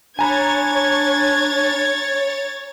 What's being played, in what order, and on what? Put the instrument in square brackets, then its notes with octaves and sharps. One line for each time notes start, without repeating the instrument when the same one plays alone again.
[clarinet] D4 [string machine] C#5 [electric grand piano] G#5 A#5 B5 [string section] G#6 A6